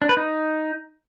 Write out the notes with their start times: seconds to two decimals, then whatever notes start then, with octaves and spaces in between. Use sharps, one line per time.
0.02 D4
0.09 B4
0.17 D#4